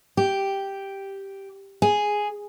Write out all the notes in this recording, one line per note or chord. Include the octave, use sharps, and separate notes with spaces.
G4
G#4